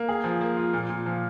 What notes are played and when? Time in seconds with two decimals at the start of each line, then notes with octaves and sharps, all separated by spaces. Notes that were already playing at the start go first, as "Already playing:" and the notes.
Already playing: A#3
0.09 G#4
0.24 F3
0.41 A#3
0.57 F4
0.73 A#2
0.90 A#2
1.06 F3